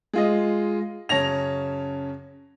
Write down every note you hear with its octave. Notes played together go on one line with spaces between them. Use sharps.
G#3 F4 D#5
F#2 C#3 C#5 A5 A#6 F7